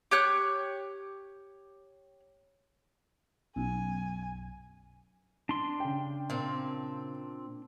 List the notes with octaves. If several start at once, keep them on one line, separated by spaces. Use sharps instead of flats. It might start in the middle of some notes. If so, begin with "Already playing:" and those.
G4 C#5 F#6
B1 F#2 G#5
D4 C6
C#3 G5
A#2 C4